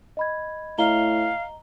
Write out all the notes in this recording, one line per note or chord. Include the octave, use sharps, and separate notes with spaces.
D#5 B5 G#6
A2 D#5 F5 A#5 G7